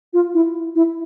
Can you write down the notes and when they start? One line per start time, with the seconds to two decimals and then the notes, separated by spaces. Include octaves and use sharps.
0.13 F4
0.34 E4
0.75 E4